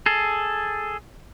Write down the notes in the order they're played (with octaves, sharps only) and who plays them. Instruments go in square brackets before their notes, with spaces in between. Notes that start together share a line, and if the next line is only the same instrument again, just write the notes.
[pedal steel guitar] G#4 A4